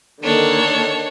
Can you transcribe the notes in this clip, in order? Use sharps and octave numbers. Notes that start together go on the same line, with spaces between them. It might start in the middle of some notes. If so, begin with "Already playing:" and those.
D3 D#3 A#3 D4 C#5